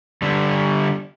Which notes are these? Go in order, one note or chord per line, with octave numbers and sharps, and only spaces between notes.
D3 G3